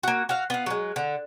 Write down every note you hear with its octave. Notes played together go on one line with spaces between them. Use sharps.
A#3 F#4
F#4 F5
B3 F4
F#3 G#3
D3